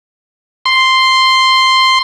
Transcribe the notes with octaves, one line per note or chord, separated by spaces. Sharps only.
C6